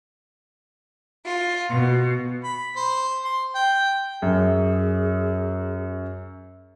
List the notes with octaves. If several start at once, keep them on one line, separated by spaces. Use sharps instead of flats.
F4
B2
B5
C5
C6
G5
F#2 G#4